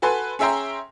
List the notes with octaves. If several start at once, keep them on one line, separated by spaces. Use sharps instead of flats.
F#4 A4 B4 G#5 C6
C#4 G#4 E5 G5 A#5 C6